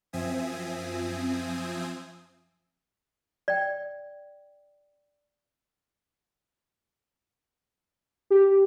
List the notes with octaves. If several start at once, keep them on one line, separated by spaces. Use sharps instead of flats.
F#2 F3 C4 E5 G#5 D#6
D5 G5
G4